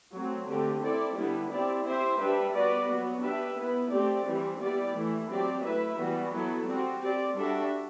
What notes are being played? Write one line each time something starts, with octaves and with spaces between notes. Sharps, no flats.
F#3 A3 C4
D3 A3 C4 G4
C4 E4 A4 D5
D3 G3 B3 E4
C4 E4 G4 D5
C4 E4 G4 C5 E5
G3 D4 G4 B4 E5
B3 F#4 B4 D5
F#3 B3 F#4
B3 D4 G4 B4 E5
B3 E4 B4
A3 C4 G4 D5
E3 G3 C4
G3 B3 E4 G4 D5
E3 A3 E4
F#3 C4 G4 D5
A3 E4 B4 E5
E3 G3 B3 F#4
F#3 B3 E4 A4
G3 C4 F#4
C4 G4 D5
G3 D4 F#4 A4 E5